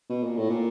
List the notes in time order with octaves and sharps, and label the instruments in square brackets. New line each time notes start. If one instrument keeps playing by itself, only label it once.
[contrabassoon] B2
A#2
A2
A#2